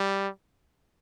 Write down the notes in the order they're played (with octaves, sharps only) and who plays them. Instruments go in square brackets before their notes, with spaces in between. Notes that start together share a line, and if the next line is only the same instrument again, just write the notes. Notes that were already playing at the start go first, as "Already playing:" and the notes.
Already playing: [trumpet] G3